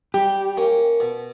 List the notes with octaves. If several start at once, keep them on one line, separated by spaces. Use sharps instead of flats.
G3 G4
A#3 C#4
B2